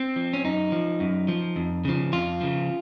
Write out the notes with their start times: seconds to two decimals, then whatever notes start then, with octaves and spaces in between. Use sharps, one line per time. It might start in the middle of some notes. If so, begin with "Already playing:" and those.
Already playing: C4
0.16 F3
0.33 C#4
0.44 F#2 D#4
0.72 F3
1.00 F#2
1.28 F3
1.56 F2
1.85 C#3 F3
2.12 F2 F4
2.41 C#3 F3